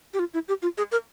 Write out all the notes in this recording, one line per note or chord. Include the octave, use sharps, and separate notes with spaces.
G4
F4
E4
G4
F4
G#4
A#4